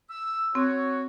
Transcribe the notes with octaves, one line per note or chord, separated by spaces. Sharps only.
E6
C4 F#4 C#5